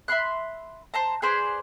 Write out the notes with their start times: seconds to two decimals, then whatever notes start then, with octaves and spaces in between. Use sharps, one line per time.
0.08 E5 B5 C6 F#6
0.94 C5 A5 A#5
1.22 G#4 B4 C5 D5